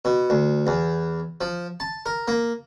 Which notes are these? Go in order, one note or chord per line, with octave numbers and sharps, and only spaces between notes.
B2
D2
E2
F3
A5
A#4
A#3